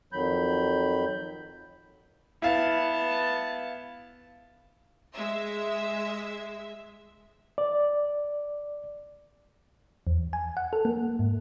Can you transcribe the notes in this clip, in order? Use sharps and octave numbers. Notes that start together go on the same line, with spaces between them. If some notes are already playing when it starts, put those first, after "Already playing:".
F2 D#3 F#3 B5 G6
B3 E4 F5 A5
G#3 E5
D5
E2
G#5
F#5
A4
A#3
G#2